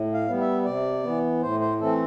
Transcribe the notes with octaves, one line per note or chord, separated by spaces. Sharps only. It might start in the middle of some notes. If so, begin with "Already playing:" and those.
Already playing: A2
F5
G3 B3
E5
C3 D5
E3 B3
A2 C5
C5
E3 A3 C4 A4